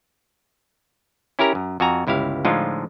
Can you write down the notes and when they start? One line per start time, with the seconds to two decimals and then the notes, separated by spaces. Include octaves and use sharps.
1.39 C#4 E4 G4 A#4 A#5
1.55 F#2
1.80 F2 F#4 G#5 A#5
2.07 G1 C#2 E4 G4 F5
2.45 A2 D3 F3 G#3 D#4 F4